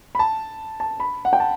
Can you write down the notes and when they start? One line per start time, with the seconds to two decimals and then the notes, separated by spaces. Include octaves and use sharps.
0.15 B5
0.19 A5
0.80 A5
1.00 B5
1.25 F#5
1.33 G5
1.40 A5